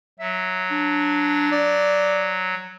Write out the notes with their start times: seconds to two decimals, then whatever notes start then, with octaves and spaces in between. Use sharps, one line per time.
0.19 F#3 E5
0.71 D4
1.52 D5